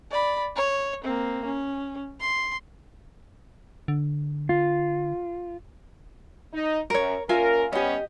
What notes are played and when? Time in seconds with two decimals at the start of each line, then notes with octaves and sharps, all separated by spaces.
0.11 D5 B5
0.56 C#5
1.04 A#3 C4
1.45 C#4
2.20 C6
3.88 D3
4.49 F4
6.53 D#4
6.90 F#2 A#4 C#5
7.29 A#2 C#4 F4 A#4 E5 G#5
7.73 G3 B3 C#4 G4 D#5